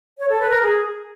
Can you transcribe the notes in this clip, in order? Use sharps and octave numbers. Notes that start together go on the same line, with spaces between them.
C#5
A4
B4
A#4
G#4